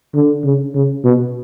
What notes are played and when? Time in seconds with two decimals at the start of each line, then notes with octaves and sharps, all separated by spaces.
0.14 D3
0.44 C#3
0.74 C#3
1.04 B2